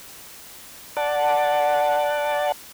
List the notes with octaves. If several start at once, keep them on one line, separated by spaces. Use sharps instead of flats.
D5 F#5 A5